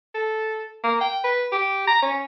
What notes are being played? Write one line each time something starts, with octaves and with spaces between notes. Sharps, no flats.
A4
A#3
G5
B4
G4
A#5
C#4